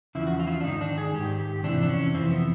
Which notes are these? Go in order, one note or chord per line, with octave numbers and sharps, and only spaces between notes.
E2 C#3 F3 E4
F#4
F4
E4
F4
D4
G#2 D#3 D#4
D4
G#4
G#2 D#3 G4
G4
F2 C3 E3 D4
D4
C#4
F2 C3 E3 C4
B3